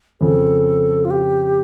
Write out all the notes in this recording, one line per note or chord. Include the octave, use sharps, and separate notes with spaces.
F2 C#3 F3 A4
F4
G4